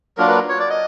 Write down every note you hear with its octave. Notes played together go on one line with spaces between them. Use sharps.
F#3 A#3 D4 F4 A#4
B4
C#5
D5
D#5